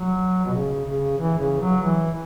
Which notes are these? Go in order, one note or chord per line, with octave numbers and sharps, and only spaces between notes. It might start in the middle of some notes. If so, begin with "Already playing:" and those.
Already playing: F#3
B2
C#3
C#3
E3
C#3
F#3
E3